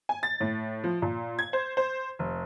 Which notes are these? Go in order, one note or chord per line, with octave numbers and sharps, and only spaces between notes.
G#5
A6
A2
F3
A#2
G#6
C5
C5
F1